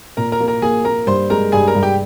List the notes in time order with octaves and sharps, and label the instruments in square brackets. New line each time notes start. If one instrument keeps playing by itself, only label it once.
[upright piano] A#2 [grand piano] A#4 A#5
[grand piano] A#4 A#5
[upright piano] A#3
[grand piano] A#4 A#5
[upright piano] A#3 [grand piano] G#4 G#5
[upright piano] A#3 [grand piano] A#4 A#5
[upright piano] G2 [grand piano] C5 C6
[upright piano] G#3 [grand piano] A#4 A#5
[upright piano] G2 [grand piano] G#4 G#5
[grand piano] A#4 A#5
[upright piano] G2
[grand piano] G4 G5